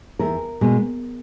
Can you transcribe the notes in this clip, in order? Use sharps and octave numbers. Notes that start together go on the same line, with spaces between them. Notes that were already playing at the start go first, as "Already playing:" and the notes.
E2 A#4
B2 G#3